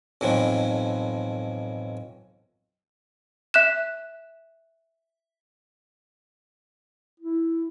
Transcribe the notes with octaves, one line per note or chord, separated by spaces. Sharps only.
B1 F2 A2 E3 F3
E5 F#6 E7
E4